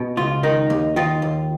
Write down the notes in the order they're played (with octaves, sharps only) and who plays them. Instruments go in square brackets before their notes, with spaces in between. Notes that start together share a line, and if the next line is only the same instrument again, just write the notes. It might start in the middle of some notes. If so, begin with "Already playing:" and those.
Already playing: [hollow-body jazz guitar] B2
C#2 F4
D#3 D#4
D#2
D#3 F4
D#2